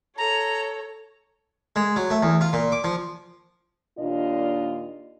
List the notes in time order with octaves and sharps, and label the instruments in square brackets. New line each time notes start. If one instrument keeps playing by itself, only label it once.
[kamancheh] A4 C#5 [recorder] A#5
[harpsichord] G#3
F#3
A3
E2
F4
A#2
D6
F3
[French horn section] D#2 A#2 D4 F4 D#5